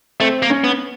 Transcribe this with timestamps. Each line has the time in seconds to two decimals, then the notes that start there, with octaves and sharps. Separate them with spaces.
0.20 A3 C4
0.42 A#3
0.50 C#4
0.64 B3